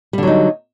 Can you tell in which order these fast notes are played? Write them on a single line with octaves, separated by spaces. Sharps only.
G3 D3 F#3 D#4